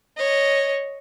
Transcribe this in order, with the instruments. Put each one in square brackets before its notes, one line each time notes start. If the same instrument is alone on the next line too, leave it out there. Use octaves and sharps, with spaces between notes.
[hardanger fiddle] C#5 D#5